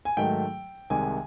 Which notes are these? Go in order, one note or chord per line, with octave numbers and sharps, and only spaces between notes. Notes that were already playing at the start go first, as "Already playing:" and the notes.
G#5
G#2 D#3 F#3 A3 G5
C2 C3 D#3 G#3 G#5